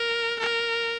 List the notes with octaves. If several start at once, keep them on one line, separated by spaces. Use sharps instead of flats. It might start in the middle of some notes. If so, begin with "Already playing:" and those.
Already playing: A#4
A#4